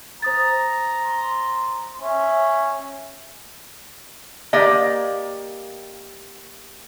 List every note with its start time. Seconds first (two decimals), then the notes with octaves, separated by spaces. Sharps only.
0.22 C5 A#5 D#6 A6
1.04 C6
2.01 C#4 E5
4.53 A#3 G4 D5 D#5